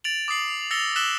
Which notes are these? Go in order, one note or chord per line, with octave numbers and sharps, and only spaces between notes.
A6 D7 F7 F#7
D6 D#6 C7 F#7
E6 A6 A#6 C#7 F7 G7
E6 F#6 B6 E7 F#7 G7